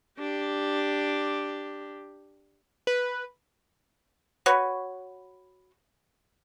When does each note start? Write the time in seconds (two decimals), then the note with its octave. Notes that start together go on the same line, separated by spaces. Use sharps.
0.19 D4 G4
2.87 B4
4.46 F#4 B4 C#5